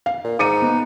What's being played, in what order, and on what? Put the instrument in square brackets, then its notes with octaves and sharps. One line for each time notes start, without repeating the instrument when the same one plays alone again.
[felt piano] F5
[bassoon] A#2
[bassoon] G#2 [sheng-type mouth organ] D#4 [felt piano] D6 C#7 D#7
[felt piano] B3